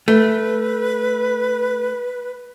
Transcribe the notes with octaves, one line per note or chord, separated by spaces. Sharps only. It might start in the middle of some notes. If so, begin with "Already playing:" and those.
A3 B4